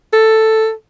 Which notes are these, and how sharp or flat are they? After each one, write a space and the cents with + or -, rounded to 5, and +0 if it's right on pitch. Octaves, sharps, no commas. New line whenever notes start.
A4 +5